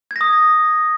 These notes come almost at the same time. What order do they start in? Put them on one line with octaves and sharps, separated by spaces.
G#6 A#6 D#6